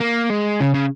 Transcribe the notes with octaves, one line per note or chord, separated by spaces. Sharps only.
A#3
G#3
C#3
C#3